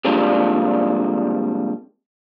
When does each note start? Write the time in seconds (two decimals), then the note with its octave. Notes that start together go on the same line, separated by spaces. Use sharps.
0.05 C3 F3 G3 G#3 A#3 D4